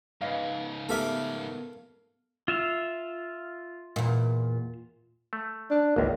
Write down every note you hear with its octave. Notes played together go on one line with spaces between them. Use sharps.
G#2 C#3 B4 D#5 F5
A3 B3 G4 A4 A#4 E5 F5 D6
F4 E5 F5
E2 A#2
A3
D4
G#1 C#2 A#3